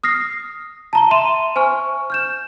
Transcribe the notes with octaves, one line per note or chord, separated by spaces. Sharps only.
D#6 F6 A#6 C7
A5 A#5 G7
E5 C6 D#7 E7
C5 G#5 C#6 F6
F6 G6 E7